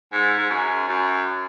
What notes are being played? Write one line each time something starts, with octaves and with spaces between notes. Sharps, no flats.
G#2
G#2
F#2
F#2